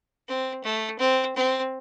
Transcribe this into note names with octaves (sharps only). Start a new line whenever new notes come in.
C4
A3
C4
C4